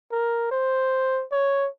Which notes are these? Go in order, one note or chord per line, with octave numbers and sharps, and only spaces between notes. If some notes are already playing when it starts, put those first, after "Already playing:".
A#4
C5
C#5